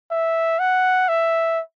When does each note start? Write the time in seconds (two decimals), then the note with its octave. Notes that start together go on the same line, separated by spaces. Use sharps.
0.11 E5
0.59 F#5
1.09 E5